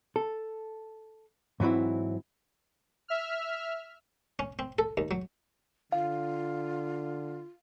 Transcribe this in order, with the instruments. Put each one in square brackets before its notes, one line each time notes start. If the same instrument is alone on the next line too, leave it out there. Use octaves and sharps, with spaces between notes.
[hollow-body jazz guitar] A4
G#2 E3 F#3 C4 E4
[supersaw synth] E5 F6
[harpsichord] C#4
C4
A4
D#2
F#3
[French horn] D3 [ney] F4 [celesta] F5